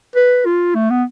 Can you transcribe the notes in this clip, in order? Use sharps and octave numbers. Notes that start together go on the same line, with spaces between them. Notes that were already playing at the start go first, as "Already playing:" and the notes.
B4
F4
A3
B3